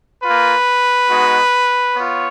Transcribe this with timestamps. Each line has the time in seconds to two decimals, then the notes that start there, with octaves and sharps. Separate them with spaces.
0.23 A#3 F4 B4
1.09 G#3 B3 D#4 F#4
1.96 B3 F4 C#5